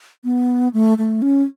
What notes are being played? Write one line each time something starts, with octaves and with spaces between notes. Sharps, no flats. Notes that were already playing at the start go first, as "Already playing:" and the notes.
B3
A3
A3
C#4